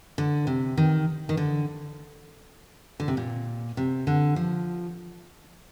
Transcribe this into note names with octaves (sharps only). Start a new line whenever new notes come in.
D3
C3
D#3
D#3
D3
D3
C3
A#2
C3
D3
F3